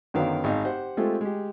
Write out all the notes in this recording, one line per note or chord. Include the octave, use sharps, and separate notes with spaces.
F#2 D3 D#3 F#3 B3 F5
G#1 G#2 D#4 F5
G4 C5 F#5
G#3 A3 C4 F4 G4 A4
G#3 G4